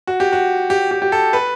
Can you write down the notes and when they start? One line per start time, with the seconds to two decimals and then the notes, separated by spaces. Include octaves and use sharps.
0.07 F#4
0.20 G4
0.33 F#4
0.70 G4
0.91 G4
1.02 G4
1.12 A4
1.33 B4